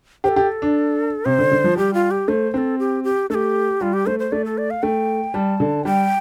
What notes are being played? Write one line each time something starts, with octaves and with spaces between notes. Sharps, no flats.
G4 C5
A4
G4
D4
C3 C5
D3
D3
F3
G3 G4
F4
G4
A3 C5
C4 A4 C5
G4
G4
A3 G4 A4
G3 F4
G4
A3 C5
C5
A3 D5
A4
D5
F5
A3 G5
G3 A5
D3
G3 G5